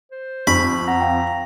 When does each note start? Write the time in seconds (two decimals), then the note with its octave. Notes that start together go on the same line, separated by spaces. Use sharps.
0.12 C5
0.47 F2 B5 C#6
0.88 F#5 A#5
1.01 F5 G5